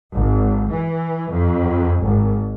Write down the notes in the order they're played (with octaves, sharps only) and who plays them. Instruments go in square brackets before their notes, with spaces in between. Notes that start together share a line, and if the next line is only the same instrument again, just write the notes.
[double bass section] G#1
E3
F2
G#1